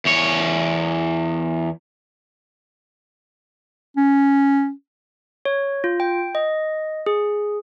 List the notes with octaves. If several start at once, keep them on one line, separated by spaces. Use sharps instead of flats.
E2 C#5
C#4
C#5
F4
G5
D#5
G#4